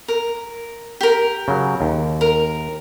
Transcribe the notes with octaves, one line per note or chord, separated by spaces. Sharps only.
A#4
G4 A#4
C#3 F#3
D#2
A#4